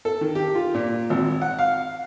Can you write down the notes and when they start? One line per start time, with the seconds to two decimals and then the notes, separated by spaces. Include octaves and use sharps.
0.05 A4
0.21 D#3
0.35 G4
0.55 F4
0.74 A#2
1.10 G#1
1.41 F#5
1.59 F5